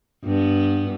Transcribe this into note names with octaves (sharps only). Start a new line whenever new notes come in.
G2 B3